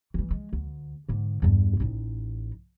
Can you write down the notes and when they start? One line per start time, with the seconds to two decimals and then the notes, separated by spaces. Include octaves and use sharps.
0.14 E3 G3
0.31 G#3
0.53 D2
1.09 G#2 D3
1.42 E2 G2
1.80 A1 D#4